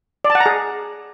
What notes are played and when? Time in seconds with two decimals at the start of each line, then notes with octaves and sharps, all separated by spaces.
0.25 D5
0.30 A5
0.35 F#5
0.40 A#5
0.46 G#4